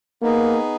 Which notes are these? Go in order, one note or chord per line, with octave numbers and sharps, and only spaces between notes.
A#3 B3 D#4 G#4